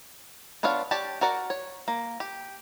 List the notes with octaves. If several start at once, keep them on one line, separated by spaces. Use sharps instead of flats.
B3 D4 F4 C#5 F5
G4 C#5 D5 A5
F#4 A#4 D5 F#5
C#5
A#3
G4